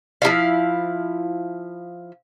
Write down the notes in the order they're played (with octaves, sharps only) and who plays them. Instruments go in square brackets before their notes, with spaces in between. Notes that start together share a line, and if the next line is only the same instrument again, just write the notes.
[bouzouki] F3 D#4 E4 F5